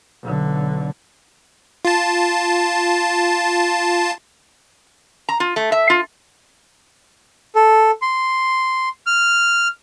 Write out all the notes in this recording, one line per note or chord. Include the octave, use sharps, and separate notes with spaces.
B1 D3
F4 A5
A#5
F4
A3
E5
F4
A4
C6
F6